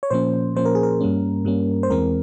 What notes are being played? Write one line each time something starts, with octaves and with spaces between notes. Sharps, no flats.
C#5
A#2 F3 A#3 C#4 C5
A#2 F3 A#3 C#4 C5
A#4
G#4
A#4
G2 G3 A#3 C#4
G2 G3 A#3 C#4
C5
E2 E3 G#3 C4 A#4